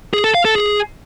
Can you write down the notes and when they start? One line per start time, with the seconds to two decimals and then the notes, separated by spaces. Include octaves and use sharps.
0.13 G#4
0.24 A4
0.34 F5
0.45 A4
0.55 G#4